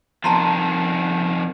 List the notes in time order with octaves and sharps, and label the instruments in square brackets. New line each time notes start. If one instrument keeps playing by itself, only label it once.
[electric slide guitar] F2 D#3 F3 [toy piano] A5 A#5 C6